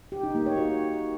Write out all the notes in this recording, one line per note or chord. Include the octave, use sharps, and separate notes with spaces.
G4
D#4
A#3
C#5
F#4